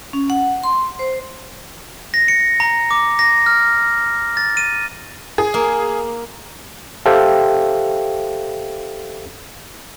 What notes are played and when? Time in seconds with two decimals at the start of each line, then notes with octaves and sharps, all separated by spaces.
0.13 C#4
0.30 F#5
0.64 C6
0.99 C5
2.14 A#6
2.28 C#7
2.60 A#5
2.91 D6
3.19 A#6
3.46 F6
4.37 A6
4.57 D#7
5.38 G#4
5.54 A#3
7.06 G4 A4 C5 E5 F5 G5